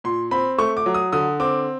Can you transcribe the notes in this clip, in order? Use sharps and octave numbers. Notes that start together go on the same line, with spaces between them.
A#2 C6
C4 B5
A3 C#6
D6
F#3
D#6
D3 D#6
C4 D6